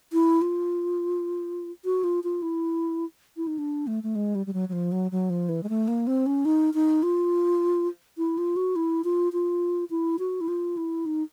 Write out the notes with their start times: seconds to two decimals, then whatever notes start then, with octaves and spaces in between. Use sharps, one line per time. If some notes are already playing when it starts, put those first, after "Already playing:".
0.13 E4
0.42 F4
1.85 F#4
2.04 F4
2.24 F4
2.42 E4
3.37 E4
3.47 D#4
3.58 D4
3.87 A3
4.03 A3
4.15 G#3
4.35 G3
4.46 G3
4.53 F#3
4.69 F#3
4.73 F3
4.92 F#3
5.11 F#3
5.30 F3
5.49 E3
5.63 G#3
5.69 A3
5.88 A#3
6.07 C4
6.26 C#4
6.45 D#4
6.74 D#4
7.03 F4
8.18 E4
8.38 F4
8.56 F#4
8.76 E4
9.04 F4
9.33 F4
9.90 E4
10.19 F#4
10.41 E4
10.48 F4
10.77 E4
11.06 D#4